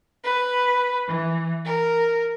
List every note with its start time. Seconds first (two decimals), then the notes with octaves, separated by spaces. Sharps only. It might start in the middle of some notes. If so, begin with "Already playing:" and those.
0.23 B4
1.08 E3
1.65 A#4